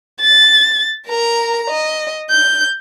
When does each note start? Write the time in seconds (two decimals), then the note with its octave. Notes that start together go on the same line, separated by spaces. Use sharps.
0.21 A6
1.07 A#4 A#5
1.70 D#5
2.31 G6